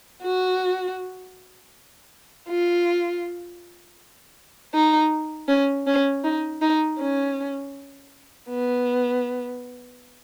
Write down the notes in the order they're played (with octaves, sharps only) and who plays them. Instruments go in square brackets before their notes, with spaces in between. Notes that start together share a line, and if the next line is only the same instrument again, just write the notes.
[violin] F#4
F4
D#4
C#4
C#4
D#4
D#4
C#4
B3